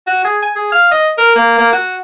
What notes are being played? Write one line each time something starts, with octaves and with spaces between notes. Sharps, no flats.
F#4
G#4
G#5
G#4
F5
D#5
A#4
A#3
A#3
F#4